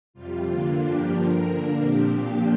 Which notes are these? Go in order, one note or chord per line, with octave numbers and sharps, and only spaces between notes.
F2 C3 G3 F4
D3 A#3 D4
G2 F3 A#3 D4 G4
G2 D3 F3 A#4
D3 A#3 D4 A#4
A#2 F3 C4 G4
A#2 F3 A#3 D4